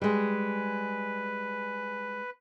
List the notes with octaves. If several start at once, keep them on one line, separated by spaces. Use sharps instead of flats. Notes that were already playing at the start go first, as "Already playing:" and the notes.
G3 G#3 B4